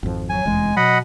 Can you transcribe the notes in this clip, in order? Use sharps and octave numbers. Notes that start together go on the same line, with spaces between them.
G#1 F2 F3
F#3 G#5
F1 E2 G#3
B2 F#3 D#5 F#5 B5